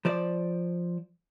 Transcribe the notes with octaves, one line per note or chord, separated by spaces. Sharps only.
F3 C5 D5